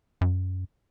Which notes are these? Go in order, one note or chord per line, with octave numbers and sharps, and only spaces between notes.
F#2